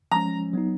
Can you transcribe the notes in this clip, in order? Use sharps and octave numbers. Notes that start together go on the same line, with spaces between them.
F3 G#3 C#4 A#5
F#3 B3 D#4